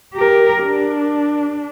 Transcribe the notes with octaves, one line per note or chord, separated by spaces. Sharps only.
G4 A#4
D4